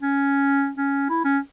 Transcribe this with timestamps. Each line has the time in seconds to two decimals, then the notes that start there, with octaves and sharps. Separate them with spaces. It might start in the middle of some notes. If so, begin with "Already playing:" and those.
0.01 C#4
0.77 C#4
1.09 E4
1.24 C#4